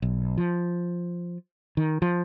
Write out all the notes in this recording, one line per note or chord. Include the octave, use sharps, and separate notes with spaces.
B1
F3
D#3
F3